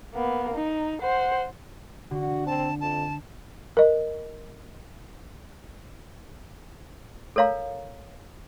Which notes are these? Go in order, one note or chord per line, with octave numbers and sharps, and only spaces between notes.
A#3 B3
D#4
C5 F#5
D3 F#4
C4 A5
F2 A5
A#4 D#5
A4 A#4 C#5 F5 A#5